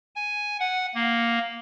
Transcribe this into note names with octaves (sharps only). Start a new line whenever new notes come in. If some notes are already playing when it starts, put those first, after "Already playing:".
G#5
F#5
A#3